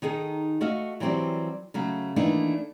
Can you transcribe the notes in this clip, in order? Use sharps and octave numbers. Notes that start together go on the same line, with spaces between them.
D#3 D#4 G#4 A4
A3 F#4 D#5 F5
E3 F#3 G3 C4 G4 D5
C#3 F#3 A3
D#3 E3 A3 A#3 D4 D#4